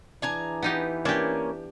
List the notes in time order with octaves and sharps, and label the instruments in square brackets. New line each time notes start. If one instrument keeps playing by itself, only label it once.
[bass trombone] E3 [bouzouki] D4 G#4 A#5
[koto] B3 D#4 G4
[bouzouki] A#3 C#4 [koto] D4 G4